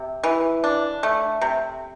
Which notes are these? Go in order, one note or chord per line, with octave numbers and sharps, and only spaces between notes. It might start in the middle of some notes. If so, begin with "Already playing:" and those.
Already playing: C3
E3
D4
A3
C3